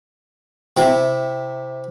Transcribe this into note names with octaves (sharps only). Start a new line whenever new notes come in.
C3 E4 G5